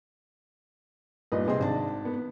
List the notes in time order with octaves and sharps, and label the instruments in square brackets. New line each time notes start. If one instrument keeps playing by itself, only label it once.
[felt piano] G2 A#2 [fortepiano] D#4 B4 D#5
[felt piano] C3 C6 [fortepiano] C4 G#4 D#5
[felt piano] G#1 D4 A5
[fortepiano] B3